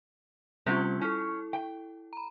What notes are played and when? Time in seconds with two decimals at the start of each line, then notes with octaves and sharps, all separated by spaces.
0.66 C3 G3 A3 C#4 F4 G4
1.01 C#4 E4 A4
1.53 G5
2.13 A#5 B5